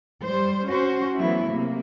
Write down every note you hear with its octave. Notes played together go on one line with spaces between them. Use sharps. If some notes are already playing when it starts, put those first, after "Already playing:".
G3 C5
C#4 F#4 C5
E3 F#3 A3 B3 E4
C3 A#3